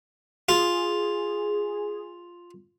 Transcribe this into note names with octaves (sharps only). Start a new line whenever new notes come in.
F4 G#4